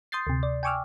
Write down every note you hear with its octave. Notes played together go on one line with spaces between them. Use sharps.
C6 D#6 G6 A6 C7
D2 C3
D5
G5 G#5 C#6 D6 E6 F6